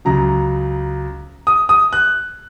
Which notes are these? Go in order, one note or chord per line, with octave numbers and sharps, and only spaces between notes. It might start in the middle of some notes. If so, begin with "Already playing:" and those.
C#2 C#3 F#3 A#5
D#6
D#6
F#6